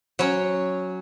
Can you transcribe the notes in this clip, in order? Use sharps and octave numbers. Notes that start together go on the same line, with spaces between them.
F#3 C#4